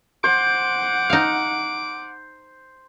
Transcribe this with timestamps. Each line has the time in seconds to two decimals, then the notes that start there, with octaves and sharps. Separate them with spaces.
0.24 C5 F#5 D6
1.10 D#4 F5